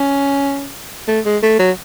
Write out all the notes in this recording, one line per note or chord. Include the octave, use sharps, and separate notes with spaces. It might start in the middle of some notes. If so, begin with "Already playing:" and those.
Already playing: C#4
A3
G#3
A3
F#3